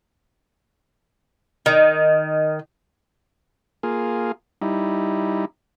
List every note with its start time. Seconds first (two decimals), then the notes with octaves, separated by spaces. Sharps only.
1.66 D#3
3.83 A#3 F4 G#4
4.62 G3 D#4 E4